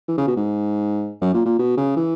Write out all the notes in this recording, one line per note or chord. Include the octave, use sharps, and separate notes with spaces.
E3
C#3
B2
G#2
F#2
A#2
A#2
B2
C#3
E3